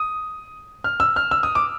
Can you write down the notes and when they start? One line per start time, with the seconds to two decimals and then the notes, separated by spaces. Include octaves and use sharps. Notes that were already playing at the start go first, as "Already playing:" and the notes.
Already playing: D#6
0.84 F6
1.00 E6
1.16 F6
1.31 E6
1.43 D#6
1.55 D6